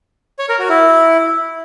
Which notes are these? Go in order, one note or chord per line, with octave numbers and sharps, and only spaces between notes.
C#5
A#4
F#4
E4